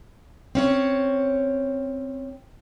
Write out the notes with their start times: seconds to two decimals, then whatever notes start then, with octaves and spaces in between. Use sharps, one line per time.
0.55 C4 C#4 C#5